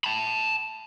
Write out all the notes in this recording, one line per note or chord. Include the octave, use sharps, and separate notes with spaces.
A5 B5